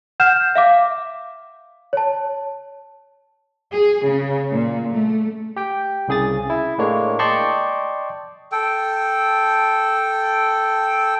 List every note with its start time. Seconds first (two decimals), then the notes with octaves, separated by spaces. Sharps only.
0.20 F#5 F6 G6 E7
0.55 E5 F5 D6
1.93 C#5 A5
3.71 G#4
4.04 C#3
4.51 A#2
4.93 A3
5.56 G4 G5
6.08 C2 C#3 G#4 D#6 A6
6.50 E4
6.78 A2 G#3 A#3 D4 C#5
7.19 D5 D#5 G5 A5 C6 C#6
8.52 A4 G5